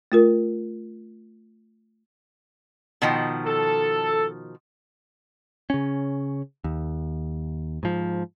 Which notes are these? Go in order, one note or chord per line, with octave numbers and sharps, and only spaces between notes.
A3 F4 A#4
B2 D#3 F3
A4
C#3 C#4
D#2
G#2 F3